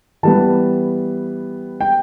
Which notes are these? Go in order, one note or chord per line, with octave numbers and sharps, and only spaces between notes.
E3 G3 B3 A5
G5